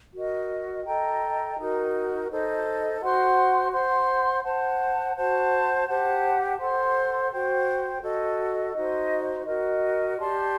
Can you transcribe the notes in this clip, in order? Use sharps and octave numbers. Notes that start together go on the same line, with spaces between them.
F#4 A#4 D#5
A4 D#5 G5 A#5
D#4 F#4 A#4
D#4 A4 C5 D#5
F#4 C5 F#5 C6
C5 F#5 C6
C5 F#5 A5
F#4 C5 F#5 A5
G4 C5 F#5 A5
A4 C5 F#5 C6
F#4 C5 G5
F#4 A4 D#5
D#4 F#4 C5 D#5
F#4 A#4 D#5
G4 D5 A5 C6